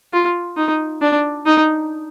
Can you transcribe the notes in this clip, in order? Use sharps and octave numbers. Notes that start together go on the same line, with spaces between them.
F4
D#4
D4
D#4